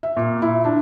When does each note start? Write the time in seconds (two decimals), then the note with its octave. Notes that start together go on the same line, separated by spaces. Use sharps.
0.03 E5
0.17 A#2
0.42 E4
0.65 D4